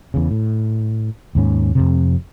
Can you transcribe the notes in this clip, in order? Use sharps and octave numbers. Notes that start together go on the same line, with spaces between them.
E2 C#3
A2
D#2 G#2 C#4
F2 G#2 C3